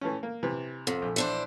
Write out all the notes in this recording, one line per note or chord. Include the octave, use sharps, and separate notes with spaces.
E3 A3 C#4
A#3
C3 E3
F2
A#1
E3 D4 C5